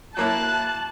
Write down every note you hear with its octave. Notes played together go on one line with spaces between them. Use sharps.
F#3 A#3 E4 A5 F#6